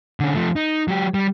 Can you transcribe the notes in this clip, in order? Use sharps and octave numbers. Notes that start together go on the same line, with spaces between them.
D3 C#4
F3 A3
D#4
F#3 G4
G3